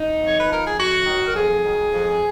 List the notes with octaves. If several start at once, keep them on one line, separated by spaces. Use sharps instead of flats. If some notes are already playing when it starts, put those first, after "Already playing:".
Already playing: D#4
F2
C#5
B4
F3 A#4
G#4
F2 F#4
D#3 F#3
A#4
F2 G#4
D#3 F#3
F2